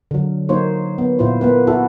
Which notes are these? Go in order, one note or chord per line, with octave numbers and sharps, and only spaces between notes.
D3 F#3
F#3 A#3 D#4 C5 C#5
B3
A#2 E4 F4 C5
A#3 B3 B4
E4 F#4 A4